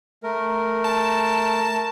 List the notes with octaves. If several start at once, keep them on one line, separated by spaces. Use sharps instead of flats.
A3 A#4
A5